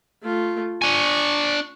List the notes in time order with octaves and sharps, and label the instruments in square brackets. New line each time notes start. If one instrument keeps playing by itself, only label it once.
[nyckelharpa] A3 F4
[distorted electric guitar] D4 G#5 [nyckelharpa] C#6